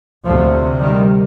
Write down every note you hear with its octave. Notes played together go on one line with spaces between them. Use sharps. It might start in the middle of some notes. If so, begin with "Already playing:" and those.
D2 C3 F3 A3
D#3 G3